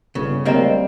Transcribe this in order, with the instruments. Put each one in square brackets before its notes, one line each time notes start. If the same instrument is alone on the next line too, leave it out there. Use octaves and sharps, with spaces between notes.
[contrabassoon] G1 [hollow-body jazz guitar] C#3
[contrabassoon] D1 [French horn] G3 [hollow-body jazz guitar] A#3 C4 [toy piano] C#5 D#5 A#5